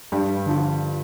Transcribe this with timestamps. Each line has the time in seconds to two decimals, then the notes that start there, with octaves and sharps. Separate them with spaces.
0.12 G2
0.46 D3 F3